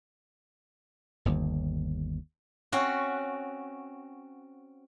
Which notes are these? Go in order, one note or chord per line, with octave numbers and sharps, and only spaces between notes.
G1 D#2
C4 C#4 F#4